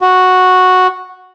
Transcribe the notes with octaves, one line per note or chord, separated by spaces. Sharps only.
F#4